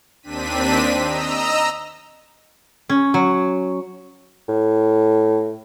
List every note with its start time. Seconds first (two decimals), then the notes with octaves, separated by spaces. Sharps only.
0.22 D#2 C4 D4 B6 D#7
1.04 D#5 A#5 E6
2.89 C#4
3.14 F#3
4.48 A2